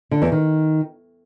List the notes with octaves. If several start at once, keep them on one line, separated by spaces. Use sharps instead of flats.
D3
E2
D#3